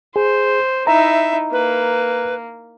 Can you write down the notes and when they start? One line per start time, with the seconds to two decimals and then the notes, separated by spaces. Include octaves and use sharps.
0.16 G#4 C5
0.87 D#4 E4 E5 A#5
1.52 A#3 B4